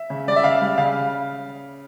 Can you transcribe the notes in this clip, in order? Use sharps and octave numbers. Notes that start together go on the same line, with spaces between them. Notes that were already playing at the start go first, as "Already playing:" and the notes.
Already playing: E5
C#3
G3 D5
E5
C#3 F5
G3
C#3 F5